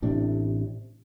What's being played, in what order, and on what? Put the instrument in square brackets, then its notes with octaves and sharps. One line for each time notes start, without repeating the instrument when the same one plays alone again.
[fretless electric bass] A1 A2 C3 D4